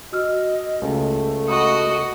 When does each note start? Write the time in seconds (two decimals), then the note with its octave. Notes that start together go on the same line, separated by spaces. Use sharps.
0.13 F#4 D#5 E6 F6
0.82 C#2 A3
1.48 F#4 D#5 F#5 B5 D#6